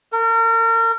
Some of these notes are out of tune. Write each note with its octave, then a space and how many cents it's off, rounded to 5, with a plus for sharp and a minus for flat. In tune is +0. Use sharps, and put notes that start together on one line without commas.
A#4 -35